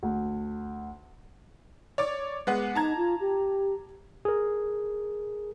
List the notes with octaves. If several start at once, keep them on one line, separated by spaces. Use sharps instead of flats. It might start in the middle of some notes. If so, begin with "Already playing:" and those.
D2
C#5 D5 D6
G#3 B3 F#5
D#4 A5 A#5 G#6
F4
G4
G#4 A#4